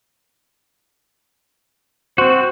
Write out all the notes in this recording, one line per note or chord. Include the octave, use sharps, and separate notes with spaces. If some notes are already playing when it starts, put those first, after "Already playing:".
C4 F#4 C5